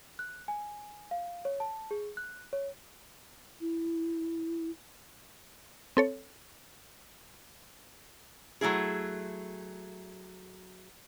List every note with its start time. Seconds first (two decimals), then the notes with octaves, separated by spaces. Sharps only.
0.19 F#6
0.48 G#5
1.11 F5
1.45 C#5
1.60 A5
1.91 G#4
2.17 F#6
2.53 C#5
3.61 E4
5.97 C4 A4 C#5
8.61 F#3 A3 E4 G#4